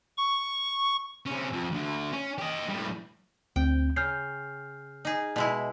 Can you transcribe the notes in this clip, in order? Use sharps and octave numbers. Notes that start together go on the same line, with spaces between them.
C#6
C3 C#4
F2
D2 D3
C#4
G4 D#5
A2 G3
D2 C4 G5
C#3 F6 G6 C7
D#4 G#4
B2 G#3 E4